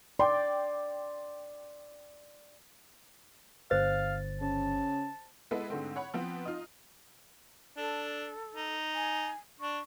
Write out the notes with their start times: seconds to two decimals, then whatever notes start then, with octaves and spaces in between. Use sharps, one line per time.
0.19 D5 G5 C6
3.71 G1 C5 F5 A6
4.41 C#3 A5
5.51 G#3 B3 E4 A4 B4
5.70 G#2 D3 A3 C4
5.96 C#5 F#5 B5
6.14 F3 B3 C4
6.45 D#4 F4
7.76 D4 A4
8.54 D#4
8.95 G#5
9.60 D4 C#6